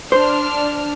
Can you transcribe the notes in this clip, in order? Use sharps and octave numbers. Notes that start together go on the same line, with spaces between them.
D4 C5 F6